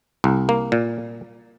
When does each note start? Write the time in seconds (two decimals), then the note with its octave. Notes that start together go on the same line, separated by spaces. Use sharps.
0.24 C2
0.49 A#3
0.72 A#2